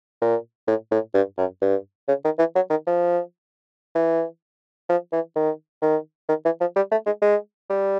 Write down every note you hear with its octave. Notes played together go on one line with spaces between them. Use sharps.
A#2
A2
A2
G2
F#2
G2
C#3
D#3
E3
F#3
D#3
F3
E3
F3
E3
D#3
D#3
D#3
E3
F3
G3
A3
G#3
G#3
G3